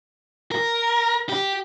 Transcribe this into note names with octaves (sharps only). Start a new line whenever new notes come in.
A#4
G4